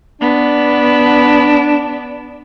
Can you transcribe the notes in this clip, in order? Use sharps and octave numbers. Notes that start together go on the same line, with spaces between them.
B3 D4